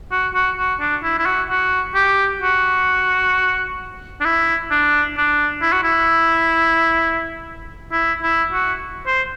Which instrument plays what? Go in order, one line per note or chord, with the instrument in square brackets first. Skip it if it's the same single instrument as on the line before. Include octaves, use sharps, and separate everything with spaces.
[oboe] F#4
F#4
F#4
D4
E4
E4
F#4
F#4
G4
F#4
D4
E4
D4
D4
E4
F#4
E4
E4
E4
F#4
C5